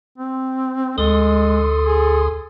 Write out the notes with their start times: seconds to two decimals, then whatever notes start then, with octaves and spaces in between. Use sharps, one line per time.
0.18 C4
0.98 D2 G#3 A4 C6 D#6
1.86 G#4